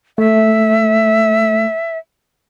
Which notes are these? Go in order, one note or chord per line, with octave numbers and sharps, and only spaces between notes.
A3 E5